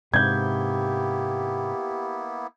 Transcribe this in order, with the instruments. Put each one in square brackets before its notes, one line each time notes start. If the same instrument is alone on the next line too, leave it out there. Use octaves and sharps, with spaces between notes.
[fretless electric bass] G#2 C3 [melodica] A#3 B3 E4 [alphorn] G4 [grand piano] G6 G#6